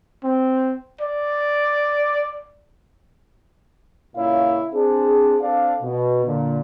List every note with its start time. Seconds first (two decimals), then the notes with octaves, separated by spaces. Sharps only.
0.24 C4
1.01 D5
4.16 C#2 A#2 C#4 E4 C#5 F5
4.74 C4 D4 G#4
5.41 C4 D4 A4 D5 F5
5.82 B2
6.26 A#2 D3